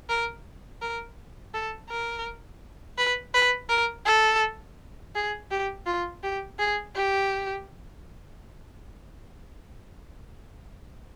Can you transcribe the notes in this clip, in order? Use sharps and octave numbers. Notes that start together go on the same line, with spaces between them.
A#4
A#4
A4
A#4
B4
B4
A#4
A4
G#4
G4
F4
G4
G#4
G4